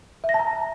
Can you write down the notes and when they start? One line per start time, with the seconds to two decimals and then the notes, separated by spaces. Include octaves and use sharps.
0.24 E5
0.29 A#6
0.34 A5
0.39 A#5